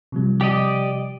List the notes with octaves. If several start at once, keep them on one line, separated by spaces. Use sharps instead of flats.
C3 F3 G3
G4 D5 D#5